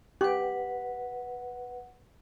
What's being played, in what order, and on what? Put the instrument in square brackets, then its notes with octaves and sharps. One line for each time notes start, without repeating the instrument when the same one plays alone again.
[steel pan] G4 [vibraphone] B4 F#5